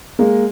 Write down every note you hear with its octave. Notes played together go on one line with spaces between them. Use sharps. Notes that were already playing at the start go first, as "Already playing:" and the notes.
G#3 A#3